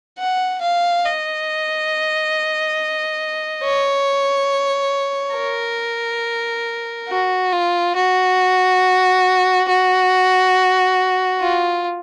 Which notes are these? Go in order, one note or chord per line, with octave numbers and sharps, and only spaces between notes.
F#5
F5
D#5
C#5
A#4
F#4
F4
F#4
F#4
F4